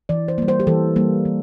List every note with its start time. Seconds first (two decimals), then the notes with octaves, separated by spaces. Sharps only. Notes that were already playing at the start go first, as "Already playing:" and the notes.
0.09 E3 D5
0.28 C5
0.38 G3 A#3
0.48 C5
0.60 G4
0.67 E3 A4
0.96 G3 A#3
1.25 E3